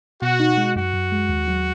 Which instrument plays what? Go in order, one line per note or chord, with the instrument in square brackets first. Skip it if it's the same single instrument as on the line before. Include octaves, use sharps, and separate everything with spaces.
[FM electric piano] B2 [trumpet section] F#4
[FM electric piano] D#4
G#3
[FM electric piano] F#2 [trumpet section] F#4
[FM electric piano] F#2
G#3
D#2
F#3